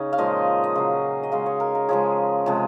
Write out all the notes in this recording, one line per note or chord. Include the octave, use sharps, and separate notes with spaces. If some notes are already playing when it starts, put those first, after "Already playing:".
Already playing: C#3 C#4 D#4
F5
A#2 F3 G#3 D#5
D#5
C#3 F#3 F5
D#5
C#3 G#3 F5
C#5
A#4
A#4
C#3 F3 G#3 G#4
C3 F3 G#3